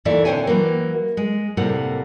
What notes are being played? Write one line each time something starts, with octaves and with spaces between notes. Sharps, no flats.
D#2 A#2 E3 A3 D5 E5
D3 C4 C5 C#5 G5 G#5
E3 F#3 A#3
G#3
A2 C3 G3 A#3 F#5